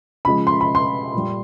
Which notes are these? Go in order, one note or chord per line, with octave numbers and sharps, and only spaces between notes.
C#3 F3 G#3 B5
C6
B5
C6
A#2 G3